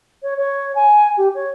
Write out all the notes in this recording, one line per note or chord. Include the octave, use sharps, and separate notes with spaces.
C#5
C#5
G#5
G4
C#5